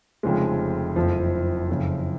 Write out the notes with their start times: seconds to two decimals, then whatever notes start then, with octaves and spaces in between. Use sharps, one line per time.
0.23 F1 F2 C#3 F3 G#3
0.96 F#1 F2 F3
1.69 F#1 F2 C#3